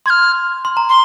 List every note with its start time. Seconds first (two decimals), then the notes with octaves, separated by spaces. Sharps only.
0.06 C6 G#6
0.10 F6
0.65 C6
0.77 A#5
0.89 C6